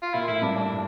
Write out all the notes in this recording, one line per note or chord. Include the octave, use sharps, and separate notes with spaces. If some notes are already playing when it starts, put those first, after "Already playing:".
F4
A#2 E4
A2 E4
G2 D4
D4